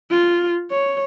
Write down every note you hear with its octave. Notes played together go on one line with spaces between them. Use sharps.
F4
C#5